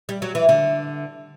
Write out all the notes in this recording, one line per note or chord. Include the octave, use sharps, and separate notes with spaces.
G3
F#3
E3
D3